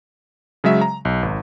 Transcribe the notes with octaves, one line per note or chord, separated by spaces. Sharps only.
C#3 F#3 G#3 E5
A#5
B1
G#1